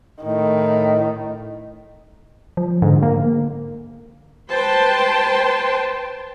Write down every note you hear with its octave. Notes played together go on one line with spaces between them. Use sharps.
A2 D#3
F3
G#2 D3
A#3
B4 C5 G5 A5 C6